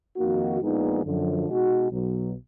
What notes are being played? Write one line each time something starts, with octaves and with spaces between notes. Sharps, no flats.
F2 D#3 A#3 D#4 F#4
A#1 A#2 G#3 B3 D#4
F#2 D3 F3
B2 G#3 D#4 F#4
B1 B2 F#3